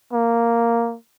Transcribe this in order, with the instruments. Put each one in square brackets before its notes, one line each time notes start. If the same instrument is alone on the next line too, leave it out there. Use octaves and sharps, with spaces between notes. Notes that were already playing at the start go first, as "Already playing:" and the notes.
[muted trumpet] A#3